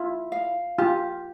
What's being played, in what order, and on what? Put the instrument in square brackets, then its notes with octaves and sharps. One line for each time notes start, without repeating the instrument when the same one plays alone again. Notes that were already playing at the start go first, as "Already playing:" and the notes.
Already playing: [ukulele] E4 [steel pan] F4
[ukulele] F5
[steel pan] F4 [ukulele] G4